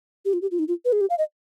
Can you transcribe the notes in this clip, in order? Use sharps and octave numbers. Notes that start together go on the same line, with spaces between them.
G4
F4
G4
F4
D#4
F4
B4
G#4
G4
F5
D#5